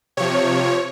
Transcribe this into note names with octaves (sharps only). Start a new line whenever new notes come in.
C3 F3 C#5